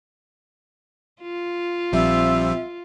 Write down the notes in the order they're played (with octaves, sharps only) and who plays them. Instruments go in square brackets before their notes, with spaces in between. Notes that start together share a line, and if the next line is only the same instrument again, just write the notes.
[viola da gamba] F4
[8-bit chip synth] A#1 F3 G3 [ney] C4 [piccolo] E5